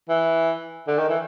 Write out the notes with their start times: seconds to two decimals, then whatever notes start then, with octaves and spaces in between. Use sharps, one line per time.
0.09 E3
0.88 D3
0.99 D#3
1.09 E3